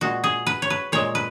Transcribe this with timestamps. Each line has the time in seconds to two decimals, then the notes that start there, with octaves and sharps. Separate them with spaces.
0.01 A#2 G#3 F#4
0.24 G#4
0.47 B4
0.62 C#5
0.70 B4
0.92 A#2 G#3 C#5
1.15 B4